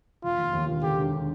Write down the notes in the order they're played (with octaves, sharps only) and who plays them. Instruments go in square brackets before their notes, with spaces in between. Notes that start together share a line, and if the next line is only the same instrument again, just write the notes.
[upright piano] E1 [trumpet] F4
[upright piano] D#2
D#2
E1
[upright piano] D3 [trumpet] G4
[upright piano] E1